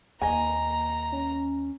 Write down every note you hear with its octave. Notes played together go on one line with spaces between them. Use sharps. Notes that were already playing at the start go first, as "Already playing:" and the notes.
D#2 A#3 D#5 G#5 A#5
C#4